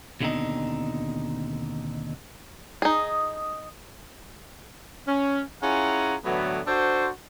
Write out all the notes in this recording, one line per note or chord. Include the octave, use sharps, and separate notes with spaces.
D#2 B2 D3 G#3 C4 D#4
D#4 G#4
C#4
C#4 E4 F4 G#4 F#5 A#5
A2 D3 E3 F#3 B3
D4 F#4 A4 C5